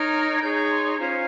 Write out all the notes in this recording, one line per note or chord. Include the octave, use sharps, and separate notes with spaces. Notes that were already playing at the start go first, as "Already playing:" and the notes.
Already playing: D#4 A#4 C#5 F6
G#6
D#4 G#4 C#5 G6
G6
C6
C#4 F4 C5 A#5